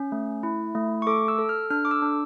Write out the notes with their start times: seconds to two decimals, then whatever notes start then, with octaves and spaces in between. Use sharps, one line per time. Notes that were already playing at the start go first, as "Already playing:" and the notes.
Already playing: C#4
0.12 A3
0.43 E4
0.75 A3
1.02 C#6
1.07 A4 D6
1.28 E6
1.39 A4
1.49 F6
1.70 D4 F6
1.85 D6
1.91 E6
2.02 D4